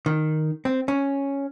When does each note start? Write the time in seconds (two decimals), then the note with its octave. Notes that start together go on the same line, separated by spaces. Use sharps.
0.06 D#3
0.65 C4
0.88 C#4